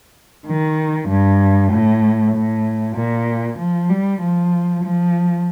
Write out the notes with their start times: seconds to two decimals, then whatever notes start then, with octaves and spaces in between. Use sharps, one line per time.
0.46 D#3
1.09 G2
1.71 A2
2.33 A2
2.96 A#2
3.58 F3
3.90 G3
4.21 F3
4.83 F3